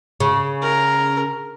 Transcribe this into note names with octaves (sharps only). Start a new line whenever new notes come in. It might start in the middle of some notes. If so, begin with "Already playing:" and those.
C#3
A#4